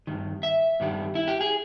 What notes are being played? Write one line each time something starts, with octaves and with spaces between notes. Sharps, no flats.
G2 D#3
E5
G2 D#3 G3
E4
G4
G#4